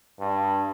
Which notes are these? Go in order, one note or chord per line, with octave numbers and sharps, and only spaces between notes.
G2